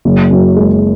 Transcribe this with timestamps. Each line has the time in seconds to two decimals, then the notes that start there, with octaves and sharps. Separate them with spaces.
0.05 F#1
0.31 F#2
0.56 G#3